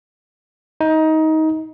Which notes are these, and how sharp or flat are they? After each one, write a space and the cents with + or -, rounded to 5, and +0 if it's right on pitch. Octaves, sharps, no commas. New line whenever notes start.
D#4 +20